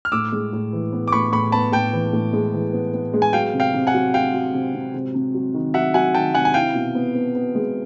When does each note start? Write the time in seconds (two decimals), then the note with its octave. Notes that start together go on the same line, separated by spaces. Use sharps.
0.05 F6
0.12 A2 D6 E6
0.32 G#3
0.53 A2
0.73 E3
0.93 B3
1.08 D6
1.12 A2 B5 C#6
1.32 A2 B5 C#6
1.52 B3 A5 B5
1.72 A2 G5 A5
1.93 E3
2.13 A2
2.33 G#3
2.54 E3
2.73 B3
2.93 B3
3.14 G#3
3.22 G#5
3.33 F#3 F5 G5
3.54 C3
3.60 F5 G5
3.74 C3
3.87 F#5 G#5
3.94 F#3
4.14 F#3 F5 G5
4.34 F#3
4.54 C3
4.74 C3
4.94 C3
5.14 C3
5.34 F#3
5.54 D#3
5.74 F#3 E5 F#5
5.94 F#3 F#5 G#5
6.15 D#3 G5 A5
6.34 C3 F#5 G#5
6.45 G#5
6.54 E4 F5 G5
6.75 B2
6.95 B3
7.14 B3
7.35 B3
7.55 G#3